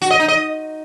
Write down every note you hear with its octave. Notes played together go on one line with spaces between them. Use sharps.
F#4
D#5
D#4
D#5